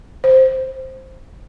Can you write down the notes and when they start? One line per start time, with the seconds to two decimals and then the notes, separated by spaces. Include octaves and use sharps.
0.24 C5